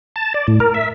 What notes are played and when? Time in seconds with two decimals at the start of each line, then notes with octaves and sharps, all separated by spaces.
0.16 A5
0.34 D5
0.48 A2
0.60 A#4
0.74 E5